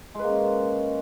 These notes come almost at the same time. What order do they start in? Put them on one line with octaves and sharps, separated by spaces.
G#3 B4 A#3 C#4